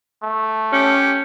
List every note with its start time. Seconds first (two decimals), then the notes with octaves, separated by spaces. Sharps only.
0.23 A3
0.72 C#4 G4